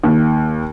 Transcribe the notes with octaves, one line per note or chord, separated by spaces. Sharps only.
D#2